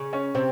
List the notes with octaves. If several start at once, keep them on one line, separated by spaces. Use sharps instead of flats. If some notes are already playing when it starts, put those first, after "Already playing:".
Already playing: C#3
C#4
C3 C4